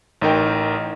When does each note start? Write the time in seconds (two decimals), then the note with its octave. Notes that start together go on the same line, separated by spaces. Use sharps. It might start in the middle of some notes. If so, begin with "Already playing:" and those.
0.21 A1 D#4 A#4 G5